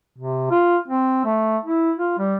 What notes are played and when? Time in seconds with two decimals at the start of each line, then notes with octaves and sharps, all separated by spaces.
0.18 C3
0.50 F4
0.88 C4
1.25 A3
1.65 E4
1.98 F4
2.19 G3